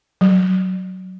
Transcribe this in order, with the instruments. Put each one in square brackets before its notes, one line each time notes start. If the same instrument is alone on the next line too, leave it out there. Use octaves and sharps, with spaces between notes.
[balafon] F#3